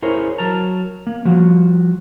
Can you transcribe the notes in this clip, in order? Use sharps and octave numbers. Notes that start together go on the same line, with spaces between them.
E4 G#4 A#4 C5 C#5
F#3 A#4 A5 A#5
A#3
F3 G3 F#4